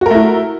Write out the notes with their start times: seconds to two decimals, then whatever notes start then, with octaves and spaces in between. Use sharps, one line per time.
0.01 F#4
0.06 A#4
0.10 A3
0.15 E4